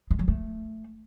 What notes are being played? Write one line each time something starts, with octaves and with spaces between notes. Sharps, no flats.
G#3
F#3
A3